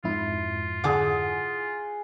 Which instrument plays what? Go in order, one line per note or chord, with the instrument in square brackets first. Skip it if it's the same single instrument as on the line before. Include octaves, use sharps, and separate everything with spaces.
[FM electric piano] F2 G#2 E4 [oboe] F4
[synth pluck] D3 D6 [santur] G#4 F#5